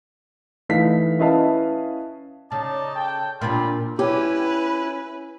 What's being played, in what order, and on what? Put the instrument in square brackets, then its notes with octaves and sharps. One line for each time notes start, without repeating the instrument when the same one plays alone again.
[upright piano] E3 A3 D#4 E4 F5 B6
C#4 E4 B4 D#5 F5 A5
[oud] C#3 [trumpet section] D#4 D5 A5
[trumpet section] A4 G5
[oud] A#2 C4 D4 [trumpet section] G3 F4 B5
[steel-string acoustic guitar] C#4 [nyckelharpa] E4 [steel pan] G4 [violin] B4